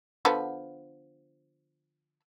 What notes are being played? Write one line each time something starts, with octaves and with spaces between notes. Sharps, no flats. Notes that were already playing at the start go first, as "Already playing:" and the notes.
D3 F3 B3